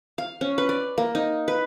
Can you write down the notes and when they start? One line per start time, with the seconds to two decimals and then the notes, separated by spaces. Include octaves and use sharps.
0.18 F5
0.41 C#4
0.58 B4
0.69 D5
0.98 A#3
1.15 D#4
1.48 B4